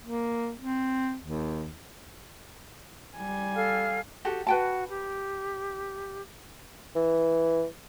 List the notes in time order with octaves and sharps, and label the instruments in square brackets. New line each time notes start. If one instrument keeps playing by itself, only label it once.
[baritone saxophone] A#3
C4
D#2
[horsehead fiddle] G3 G#5
[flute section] A4 F5 F6
[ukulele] F#4 G4 A4
[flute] F#4 [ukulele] B4 G5 A5
[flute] G4
[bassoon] E3